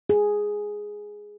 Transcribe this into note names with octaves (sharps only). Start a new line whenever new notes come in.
G#4